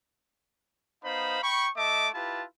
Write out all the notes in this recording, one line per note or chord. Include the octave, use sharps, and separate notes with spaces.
B3 D#4 C5 F5 B5
G5 B5 C#6
A3 D#5 E5 A5 D6
E4 F4 G4 B4 A5